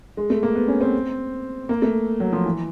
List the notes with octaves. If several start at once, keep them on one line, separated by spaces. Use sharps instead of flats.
G#3
A3
A#3
B3
C#4
C4
A#3
A3
F#3
F3
E3